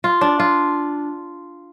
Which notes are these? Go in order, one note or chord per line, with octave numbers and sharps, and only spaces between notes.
F4
D4
F4